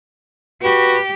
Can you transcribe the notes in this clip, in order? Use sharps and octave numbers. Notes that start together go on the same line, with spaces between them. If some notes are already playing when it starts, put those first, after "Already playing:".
F#4 G4 B4